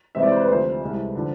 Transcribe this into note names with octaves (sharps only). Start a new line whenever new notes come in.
C3 E3 G#3 C4 E5
D5
C5
B4
D2 C3 F3 C5
C2 C3 G#3
D3 F3